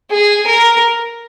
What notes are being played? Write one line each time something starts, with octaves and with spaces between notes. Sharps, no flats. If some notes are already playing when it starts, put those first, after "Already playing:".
G#4
A#4